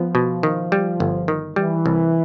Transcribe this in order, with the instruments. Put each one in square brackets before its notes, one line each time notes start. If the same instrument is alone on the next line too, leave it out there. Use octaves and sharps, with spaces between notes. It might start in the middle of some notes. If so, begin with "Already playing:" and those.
Already playing: [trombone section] F3 [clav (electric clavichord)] B3
[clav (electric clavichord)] B2
D#3
G3
G1
D#3
[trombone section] E3 [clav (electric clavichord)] G3
[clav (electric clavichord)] C2